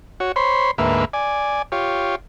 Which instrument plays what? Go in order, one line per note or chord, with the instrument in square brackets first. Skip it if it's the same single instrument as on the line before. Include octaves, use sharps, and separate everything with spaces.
[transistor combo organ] F#4 C#5
C5 C#5 B5 C6
D2 G#2 A#3 B4 E5
D5 G#5
F4 G4 C#5